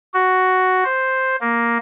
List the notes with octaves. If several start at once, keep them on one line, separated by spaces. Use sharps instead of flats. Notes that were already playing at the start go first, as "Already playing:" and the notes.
F#4
C5
A#3